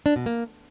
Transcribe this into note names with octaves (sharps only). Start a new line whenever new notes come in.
D4
B2
A#3